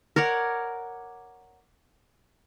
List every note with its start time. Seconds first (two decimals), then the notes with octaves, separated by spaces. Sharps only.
0.16 A#4 C#5 D5 F#5